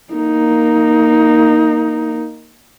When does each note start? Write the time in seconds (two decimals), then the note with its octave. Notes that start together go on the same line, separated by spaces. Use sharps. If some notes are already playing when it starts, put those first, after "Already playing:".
0.13 A#3 D#4